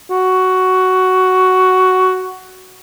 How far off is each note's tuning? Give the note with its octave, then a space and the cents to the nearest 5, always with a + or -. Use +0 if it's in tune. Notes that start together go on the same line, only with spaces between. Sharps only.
F#4 +10